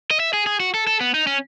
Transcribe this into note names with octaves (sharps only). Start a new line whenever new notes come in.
D#5
E5
G#4
G#4
F#4
A4
A4
B3
D#4
C#4